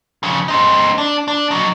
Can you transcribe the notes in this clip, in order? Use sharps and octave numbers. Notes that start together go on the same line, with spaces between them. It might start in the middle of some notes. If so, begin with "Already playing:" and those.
F2 C#3
C4 D#4
D4
D4
F#3 D#4